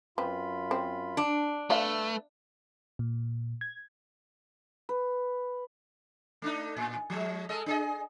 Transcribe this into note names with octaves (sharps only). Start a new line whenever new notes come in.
F#2 C4 F4 B4 B5
C4
D4
A3 B4 D5 E5 F5
A#2
G#6
B4
A3 D4 D#4
A2
F3 G#3
G#3 A4 D#5
D4 G#4 D#5